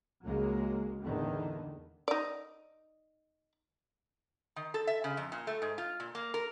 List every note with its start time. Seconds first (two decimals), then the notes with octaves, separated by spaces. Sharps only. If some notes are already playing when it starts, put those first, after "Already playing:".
0.23 C#2 F#3 G#3 A#3
1.02 E2 A2 D3 D#3
2.08 D#4 D5
4.56 D#3
4.74 A4
4.87 E5
5.04 C#3
5.17 F2
5.32 A#2
5.47 A3
5.62 G#2
5.78 F4
6.00 A#2
6.15 A#3
6.34 A#4